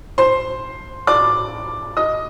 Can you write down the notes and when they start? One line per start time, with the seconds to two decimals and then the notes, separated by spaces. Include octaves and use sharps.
0.18 C5 C6
1.07 D5 D6
1.97 D#5 D#6